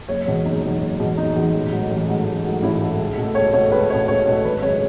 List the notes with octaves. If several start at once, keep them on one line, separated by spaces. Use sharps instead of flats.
F#1 C#5
E2 B2 G#3
F#1 D#4
E2 B2 G#3
F#1
E2 B2 G#3
F#1 D#4
E2 B2 G#3
A1
G#2 F#3 A3
A1
G#2 F#3 A3
A1
G#2 F#3 A3
A1 E4
G#2 F#3 A3
C#2
B2 A3
C#2 C#5
B2 A3 C#5
C#2 B4
B2 A3 C#5
C#2 C#5
B2 A3
G#1 B4
F#2 C#3 G#3 C#5